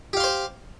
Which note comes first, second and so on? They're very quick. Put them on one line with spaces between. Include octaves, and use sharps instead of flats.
G4 F5 C6 C5